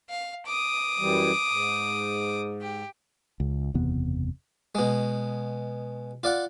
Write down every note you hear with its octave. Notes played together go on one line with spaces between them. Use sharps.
F5
D6 D#6
F#2 E3 G3
G#2
G4
C#2
F#1 E2 C3 B3
B2 G#3
F4 D5 F#5